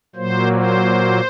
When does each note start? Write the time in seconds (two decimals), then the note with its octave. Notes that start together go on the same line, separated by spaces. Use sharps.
0.15 A#2 F#3 A#3 C5
0.52 C5